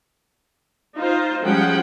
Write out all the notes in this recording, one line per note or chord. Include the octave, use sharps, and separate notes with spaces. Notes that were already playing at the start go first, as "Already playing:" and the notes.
D#4 F4 C5
F3 G3 G#3 C#4 F#5 G5